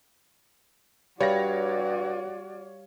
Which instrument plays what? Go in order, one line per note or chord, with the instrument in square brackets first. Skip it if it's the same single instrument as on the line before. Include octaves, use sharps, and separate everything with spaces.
[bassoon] G2 [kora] G3 [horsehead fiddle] F#4 D5 [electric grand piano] C#5 F5 A#6